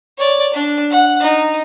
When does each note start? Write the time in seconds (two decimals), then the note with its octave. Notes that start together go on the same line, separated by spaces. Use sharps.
0.18 C#5 D5
0.54 D4
0.91 F#5
1.20 D#4